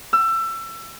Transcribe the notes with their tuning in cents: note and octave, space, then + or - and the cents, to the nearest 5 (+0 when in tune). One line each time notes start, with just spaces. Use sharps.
E6 +25